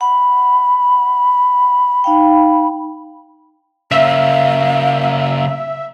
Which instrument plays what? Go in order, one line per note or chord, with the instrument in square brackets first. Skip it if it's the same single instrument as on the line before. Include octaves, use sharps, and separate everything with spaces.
[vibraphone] F#5 [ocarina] B5
[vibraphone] D#4 F5 G5
[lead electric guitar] C#3 A#3 [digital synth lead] E5 [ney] F5